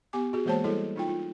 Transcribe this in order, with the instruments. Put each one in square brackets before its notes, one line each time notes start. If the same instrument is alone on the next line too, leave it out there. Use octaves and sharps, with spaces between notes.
[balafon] B3 G4 G#5 D6
F#4 G#4
E3 G#3 A#3 C5 C#5 A5
G3 E4 G#4 A4 C#5 D#5
D#4 F4 G5
F4